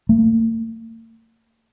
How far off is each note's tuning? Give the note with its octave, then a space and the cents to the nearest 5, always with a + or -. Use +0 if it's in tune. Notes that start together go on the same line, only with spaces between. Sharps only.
A3 +45